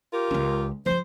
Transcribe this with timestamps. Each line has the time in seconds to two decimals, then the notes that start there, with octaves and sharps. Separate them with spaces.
0.12 F4 G4 A#4
0.31 C#2 C#4
0.86 F3 F4 C5